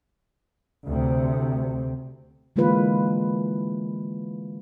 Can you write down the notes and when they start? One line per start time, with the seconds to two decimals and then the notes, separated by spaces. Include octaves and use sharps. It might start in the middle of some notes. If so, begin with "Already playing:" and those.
0.86 D2 C3
2.56 D3 E3 G#3 A#3 F4 B4